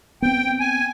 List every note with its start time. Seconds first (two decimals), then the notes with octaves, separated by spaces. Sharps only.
0.22 B3 C4 G5
0.60 G#5